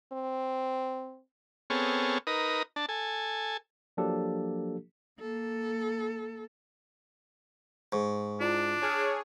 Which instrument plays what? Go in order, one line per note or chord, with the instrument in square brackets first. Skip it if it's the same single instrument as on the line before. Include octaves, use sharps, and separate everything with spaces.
[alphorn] C4
[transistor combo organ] B3 C4 G#4 A4 C#5 F6
D#4 A#4 B4 D#6
D4 A5
A4 G#5
[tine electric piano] F3 F#3 A#3 D4 G4 A4
[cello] A#3 A4
[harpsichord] G#2 [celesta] C#6
[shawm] D4 [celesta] E4 F4 D5
[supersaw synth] G#4 C#5 [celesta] A5 F6